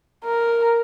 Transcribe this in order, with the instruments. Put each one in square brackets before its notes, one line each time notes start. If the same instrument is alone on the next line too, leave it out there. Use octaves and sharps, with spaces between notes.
[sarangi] A#4